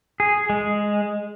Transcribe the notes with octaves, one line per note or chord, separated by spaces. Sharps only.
G#4
G#3